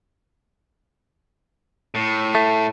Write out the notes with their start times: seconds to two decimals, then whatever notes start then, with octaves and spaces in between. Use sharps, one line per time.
1.95 A2
2.35 A3